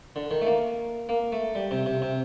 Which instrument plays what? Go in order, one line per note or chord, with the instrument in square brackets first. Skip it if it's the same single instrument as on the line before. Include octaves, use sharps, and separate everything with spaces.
[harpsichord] D3
D#3
A3
A#3
A#3
A3
G3
C3
C3
C3